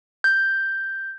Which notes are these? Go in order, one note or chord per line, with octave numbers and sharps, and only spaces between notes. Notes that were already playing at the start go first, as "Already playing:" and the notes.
G6